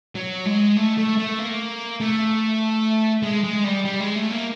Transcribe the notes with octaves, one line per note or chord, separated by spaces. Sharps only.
F#3
G#3
A3
A3
A3
A#3
A3
G#3
G#3
G3
G3
G#3
A3
A#3